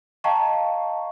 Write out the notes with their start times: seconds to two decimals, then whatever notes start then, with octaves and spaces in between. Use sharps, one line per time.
0.24 D#5 F5 G5 A5 A#5 C#6